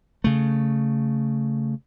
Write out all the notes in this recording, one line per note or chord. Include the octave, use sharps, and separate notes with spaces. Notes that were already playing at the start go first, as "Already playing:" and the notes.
C#3 A3